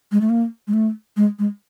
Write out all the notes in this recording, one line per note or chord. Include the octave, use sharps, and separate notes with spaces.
G#3
A3
A#3
G#3
A3
G#3
G#3